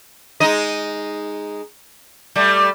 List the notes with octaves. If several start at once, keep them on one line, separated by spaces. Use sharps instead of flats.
G#3 D#4 D#5
G3 A3